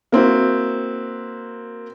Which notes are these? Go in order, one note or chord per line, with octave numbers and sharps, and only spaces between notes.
A#3 C4 E4 F#4